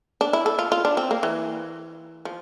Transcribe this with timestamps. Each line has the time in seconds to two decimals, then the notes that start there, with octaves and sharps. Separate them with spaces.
0.21 D4
0.33 E4
0.46 A4
0.59 F4
0.72 F4
0.85 D4
0.97 C4
1.11 A#3
1.23 E3
2.25 F3